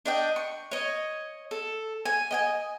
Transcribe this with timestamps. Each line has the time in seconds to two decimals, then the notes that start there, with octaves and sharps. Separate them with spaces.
0.06 D4 D#5 G5
0.36 C#6
0.71 C#5 D#5
1.51 A4
2.06 G#5
2.31 D#5 G5 G#5